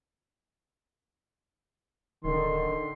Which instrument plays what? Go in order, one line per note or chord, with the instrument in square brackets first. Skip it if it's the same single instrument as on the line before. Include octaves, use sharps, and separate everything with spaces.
[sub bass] D1 [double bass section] D3 [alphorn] D#3 [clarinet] C6